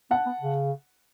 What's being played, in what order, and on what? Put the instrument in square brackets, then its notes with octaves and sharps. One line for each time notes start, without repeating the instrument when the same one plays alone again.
[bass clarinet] B3 [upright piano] F#5 A5
[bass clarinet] B3
C#3